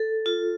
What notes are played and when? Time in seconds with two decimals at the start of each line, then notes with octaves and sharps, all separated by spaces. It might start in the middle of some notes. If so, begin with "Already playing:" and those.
Already playing: A4
0.26 F4